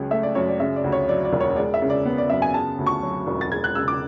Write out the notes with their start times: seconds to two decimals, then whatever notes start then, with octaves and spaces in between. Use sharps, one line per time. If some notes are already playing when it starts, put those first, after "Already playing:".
Already playing: C#2 C#3 F#3
0.11 A3 E5
0.23 D5
0.35 F#2 C#5
0.48 D5
0.59 C#3 E5
0.76 D5
0.84 D2
0.92 C#5
1.09 F#3 D5
1.25 D5
1.33 E1
1.40 C#5
1.56 G#3 D5
1.74 E5
1.82 C#3
1.90 D5
2.05 B3
2.18 D5
2.30 F#2 E5
2.42 G#5
2.54 C#3 A5
2.79 D2
2.86 C#6
3.03 F#3
3.27 E1
3.41 A6
3.51 G#3 G#6
3.64 F#6
3.75 C#3 E6
3.88 D6